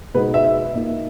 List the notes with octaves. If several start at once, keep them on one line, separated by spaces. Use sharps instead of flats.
B2 G#3 B3 D#4 B4
E5
E5
A#2 A#3 D#4